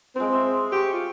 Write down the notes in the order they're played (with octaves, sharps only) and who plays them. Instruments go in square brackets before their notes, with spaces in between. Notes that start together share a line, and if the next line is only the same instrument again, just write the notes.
[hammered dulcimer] G#3 F4 C5 [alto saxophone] C4
[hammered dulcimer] E5
[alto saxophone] G4 [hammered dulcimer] G5 C#6
[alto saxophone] F4